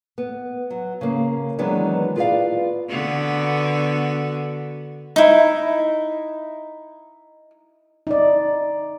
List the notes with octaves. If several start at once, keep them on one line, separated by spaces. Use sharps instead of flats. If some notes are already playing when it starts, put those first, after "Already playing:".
B3
F#3
C#3 A#3
D#3 E3 F#3 G#3 B3 D4
F4 G#4 B4 C#5 D5 F5
D3 B3 F#4
D#4 E4
D#4 D5